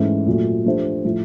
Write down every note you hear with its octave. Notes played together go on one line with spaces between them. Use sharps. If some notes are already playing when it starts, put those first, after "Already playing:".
Already playing: G#2 E3 A3 C#4
A#2 F#3 A3
F3 A3 D4 G4 C5
A2 F3 A3